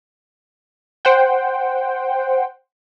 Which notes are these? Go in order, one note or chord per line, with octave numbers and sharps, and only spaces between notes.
C5 F#5 G5